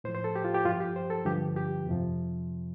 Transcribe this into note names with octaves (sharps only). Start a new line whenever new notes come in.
A2 F3 C5
C5
A4
G4
F4
G4
G2 F3 F4
G4
C5
A4
G2 D3 F3 G4
G4
F2 C3 F3